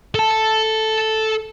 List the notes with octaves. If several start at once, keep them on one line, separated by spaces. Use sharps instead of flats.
A4 A5